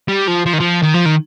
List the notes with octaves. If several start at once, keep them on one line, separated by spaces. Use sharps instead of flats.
G3
F3
F3
D#3
F3
D#3
F3
D#3